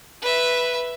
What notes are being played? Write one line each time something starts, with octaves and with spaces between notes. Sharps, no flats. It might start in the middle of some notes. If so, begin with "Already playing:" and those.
B4 E5